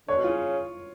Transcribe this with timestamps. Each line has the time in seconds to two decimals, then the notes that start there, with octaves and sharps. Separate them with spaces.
0.08 D3 C#5
0.17 B2
0.24 C#3 F4